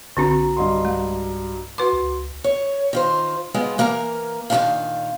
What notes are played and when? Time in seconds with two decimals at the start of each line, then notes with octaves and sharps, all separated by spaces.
0.17 B1 D3 C4 D4 F#4 A#5
0.56 G2 D#5 C6
0.85 G#3
1.78 F#4 B4 C6 D6
1.93 C#2
2.44 C#5
2.93 D#3 F4 C5
3.54 G#3 B3 F4
3.78 E3 A#3 A#4 A5 A#5
4.50 A#2 D#3 F#3 C#4 D4 F5